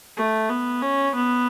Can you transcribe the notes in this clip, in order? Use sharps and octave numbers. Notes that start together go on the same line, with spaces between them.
A3
B3
C#4
B3